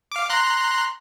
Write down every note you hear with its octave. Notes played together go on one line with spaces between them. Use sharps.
F5 D6
A#5 C6 F#6